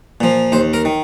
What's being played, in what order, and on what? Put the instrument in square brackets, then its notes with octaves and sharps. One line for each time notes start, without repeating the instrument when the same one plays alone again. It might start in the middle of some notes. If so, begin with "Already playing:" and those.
[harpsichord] A#2 F3
D#2 C5
A#4
D#3